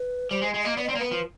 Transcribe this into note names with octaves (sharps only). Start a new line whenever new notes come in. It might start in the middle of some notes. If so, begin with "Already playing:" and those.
Already playing: B4
G3 C5
G#3
G#3
A#3 D#5
B3 D5
D#5
C4
A#3 D5
B3 B4
F3